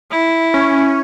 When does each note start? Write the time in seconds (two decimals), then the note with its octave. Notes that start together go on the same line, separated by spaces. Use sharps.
0.11 E4
0.54 C#4